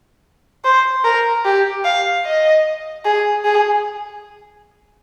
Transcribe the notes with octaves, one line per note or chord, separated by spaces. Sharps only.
C5
A#4
G4
F5
D#5
G#4
G#4